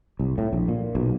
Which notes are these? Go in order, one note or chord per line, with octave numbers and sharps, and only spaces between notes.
C2
A2
A#1
A#2
B1